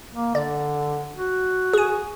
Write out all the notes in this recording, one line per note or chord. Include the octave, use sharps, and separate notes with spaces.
A#3
D3 D5
F#4
G#4 G#5